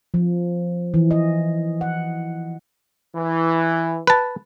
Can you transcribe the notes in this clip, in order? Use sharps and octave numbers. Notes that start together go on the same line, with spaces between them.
F3
E3
D#5
F#5
E3
B4 A5